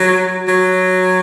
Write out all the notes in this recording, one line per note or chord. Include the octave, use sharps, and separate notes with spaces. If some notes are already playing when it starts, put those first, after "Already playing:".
Already playing: F#3
F#3